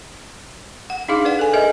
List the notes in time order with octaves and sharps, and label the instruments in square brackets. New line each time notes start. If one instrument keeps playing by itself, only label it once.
[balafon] F#5
D4 D#4 G#4 F5 D6
B4 D5 F#5
A4 G#5
G#4 A#4 B4 D#5 E5 G#5